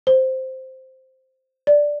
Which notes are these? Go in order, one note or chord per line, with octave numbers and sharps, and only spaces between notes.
C5
D5